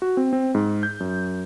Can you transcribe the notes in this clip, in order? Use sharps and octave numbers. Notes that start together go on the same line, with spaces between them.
F#4
C4
C4
G#2
G6
F#2